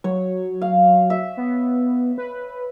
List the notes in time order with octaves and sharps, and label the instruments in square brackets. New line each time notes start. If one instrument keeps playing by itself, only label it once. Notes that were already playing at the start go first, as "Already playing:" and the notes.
[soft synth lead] F#3 [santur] C#5
[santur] F5
E5
[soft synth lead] B3
B4